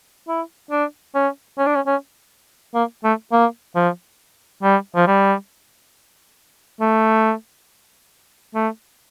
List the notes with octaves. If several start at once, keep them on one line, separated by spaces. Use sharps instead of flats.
E4
D4
C#4
C#4
D4
C#4
C#4
A#3
A3
A#3
F3
G3
F3
G3
A3
A3